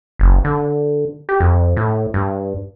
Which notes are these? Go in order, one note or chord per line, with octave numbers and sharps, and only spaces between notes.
F#1
D3
G4
F2
A2
G2